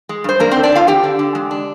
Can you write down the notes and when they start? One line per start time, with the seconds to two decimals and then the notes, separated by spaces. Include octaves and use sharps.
0.09 G#3
0.24 G2 C5
0.40 A#3 D4 A#4
0.51 D3 C4 C5
0.63 D4 D5
0.72 D3 F4 F5
0.87 D3 G4 G5
1.04 D3
1.19 D3
1.35 G#3
1.51 D4